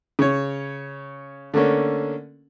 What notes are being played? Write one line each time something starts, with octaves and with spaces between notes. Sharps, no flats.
C#3 C#5
D3 A3 A#3 C#4 D4